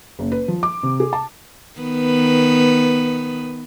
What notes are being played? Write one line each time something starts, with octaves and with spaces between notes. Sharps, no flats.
F#1
B4
F3
D6
C3
G#4
A5
D#3 B3 B4